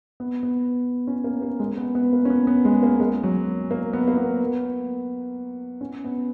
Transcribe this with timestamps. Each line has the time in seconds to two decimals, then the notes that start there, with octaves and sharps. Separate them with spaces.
0.20 B3
0.43 B3
1.07 C#4
1.24 A#3
1.42 A#3
1.60 G#3
1.78 B3
1.95 B3
2.13 A#3
2.25 C#4
2.30 B3
2.47 B3
2.65 G#3
2.83 A#3
3.00 G#3
3.23 F#3
3.71 A#3
3.93 B3
4.08 A#3
4.17 B3
5.81 C#4
6.04 B3